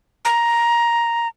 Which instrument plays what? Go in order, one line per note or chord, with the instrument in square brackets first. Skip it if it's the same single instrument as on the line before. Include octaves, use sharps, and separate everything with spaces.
[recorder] A#5